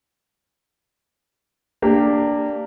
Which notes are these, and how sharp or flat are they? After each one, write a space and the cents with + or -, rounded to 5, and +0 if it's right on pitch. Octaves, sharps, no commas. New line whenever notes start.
A#3 -20 D4 +0 G4 +0